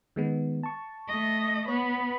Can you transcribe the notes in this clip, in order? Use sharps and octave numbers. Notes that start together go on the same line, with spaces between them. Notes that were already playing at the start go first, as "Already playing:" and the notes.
D#3 G#3 B3
A5 C#6
A3 D#5
B3 B4 C#5